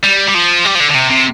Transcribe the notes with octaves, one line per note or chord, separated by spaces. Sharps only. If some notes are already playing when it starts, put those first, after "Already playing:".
G3
G3
F3
G3
F3
D3
D3
C3
C3